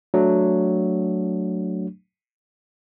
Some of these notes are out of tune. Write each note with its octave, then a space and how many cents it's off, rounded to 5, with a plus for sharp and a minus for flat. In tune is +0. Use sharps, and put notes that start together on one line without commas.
F#3 +0 A3 +0 D4 +0